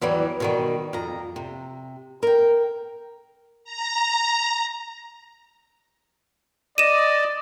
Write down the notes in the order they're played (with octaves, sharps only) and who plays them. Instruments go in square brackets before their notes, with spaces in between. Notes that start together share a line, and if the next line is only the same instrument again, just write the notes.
[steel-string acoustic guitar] E2 E3 F#3 G3
B2 D#3 G3
F2 A#5
C3
A#4 G5
[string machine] A#5
[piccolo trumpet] D5 [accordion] D#5 [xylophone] D#7 E7